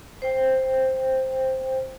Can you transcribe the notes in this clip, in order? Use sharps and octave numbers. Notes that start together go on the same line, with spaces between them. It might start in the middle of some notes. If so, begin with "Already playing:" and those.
C5 G5